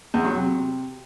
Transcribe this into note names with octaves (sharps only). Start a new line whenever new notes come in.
E2
F#3
C3